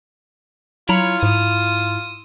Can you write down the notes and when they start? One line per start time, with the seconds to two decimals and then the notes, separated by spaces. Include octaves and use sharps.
0.89 F#3 E4 F4 C#5 A#5 B5
1.23 G#2 D#6 E6